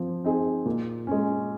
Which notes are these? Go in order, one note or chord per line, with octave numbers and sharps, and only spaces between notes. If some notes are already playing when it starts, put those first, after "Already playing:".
Already playing: F3 C4
C4 D#4 G#4
A#2
G#3 C#4